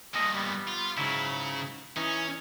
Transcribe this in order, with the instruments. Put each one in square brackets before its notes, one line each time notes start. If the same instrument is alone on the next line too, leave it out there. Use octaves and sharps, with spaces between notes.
[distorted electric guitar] G2 A#2 [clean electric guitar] A4 D#5
[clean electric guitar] G3 B3
[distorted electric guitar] F4
[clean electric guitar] G#2 F#3 E4 [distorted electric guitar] C#3
[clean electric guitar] E3 D#4 [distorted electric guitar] C#4